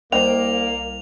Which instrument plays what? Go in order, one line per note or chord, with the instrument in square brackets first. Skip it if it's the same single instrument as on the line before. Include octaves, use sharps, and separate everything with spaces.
[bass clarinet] C2 [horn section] A#3 [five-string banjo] C5 D#5 G5 [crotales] F7